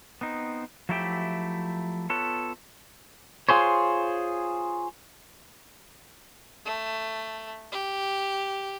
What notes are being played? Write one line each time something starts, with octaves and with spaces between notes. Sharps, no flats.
B3 C4 D#4
F3 F#3 A3 E4 G4 G5
B3 F4 A4 B4 C#5
F4 G#4 C5 C#5
A3
G4